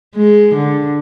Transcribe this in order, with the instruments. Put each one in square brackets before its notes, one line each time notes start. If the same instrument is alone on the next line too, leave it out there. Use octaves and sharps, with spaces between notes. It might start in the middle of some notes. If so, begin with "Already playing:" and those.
[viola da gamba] G#3
D3